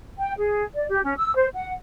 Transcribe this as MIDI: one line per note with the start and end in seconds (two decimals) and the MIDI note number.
0.18 0.32 79
0.38 0.63 68
0.74 0.85 74
0.90 1.00 67
1.04 1.13 61
1.17 1.33 88
1.34 1.47 72
1.53 1.70 78